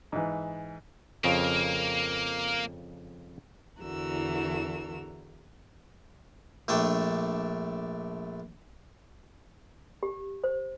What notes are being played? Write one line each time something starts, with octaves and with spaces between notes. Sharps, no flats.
G#2 E3
F2 C#3 A#3 F5
E2 D3 E3 F#4 A#4 E6
A#1 A3 D4 G5
G4
C5